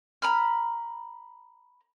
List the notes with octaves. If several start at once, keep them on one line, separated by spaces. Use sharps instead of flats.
A#5 B5 F6